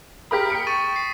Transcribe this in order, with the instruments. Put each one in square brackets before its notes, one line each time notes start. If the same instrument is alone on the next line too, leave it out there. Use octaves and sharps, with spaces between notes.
[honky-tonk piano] G4 A#4 B5 [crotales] D#6 B6
[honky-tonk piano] G5 C#7 D7
[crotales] C#6 A6 D#7
C7